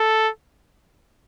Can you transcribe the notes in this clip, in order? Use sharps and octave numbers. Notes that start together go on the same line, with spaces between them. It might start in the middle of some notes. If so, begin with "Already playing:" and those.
Already playing: A4